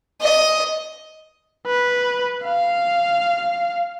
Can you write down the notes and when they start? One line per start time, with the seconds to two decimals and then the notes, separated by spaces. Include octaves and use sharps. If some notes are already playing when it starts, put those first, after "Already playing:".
0.21 D#5
1.67 B4
2.45 F5